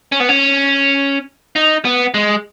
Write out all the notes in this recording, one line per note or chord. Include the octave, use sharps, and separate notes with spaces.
C#4
B3
C#4
D#4
B3
G#3